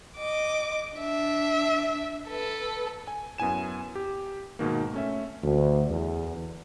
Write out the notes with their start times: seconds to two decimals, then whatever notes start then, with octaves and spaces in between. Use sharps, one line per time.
0.17 D#5 D6
0.97 D4 E5
2.28 A4 B4
3.07 G#5
3.38 F#2 B3 E4 G#5 E7
3.95 G4
4.59 G#2 B2 D#3 A#3
4.93 A3 C#4 E5
5.43 D2
5.90 E2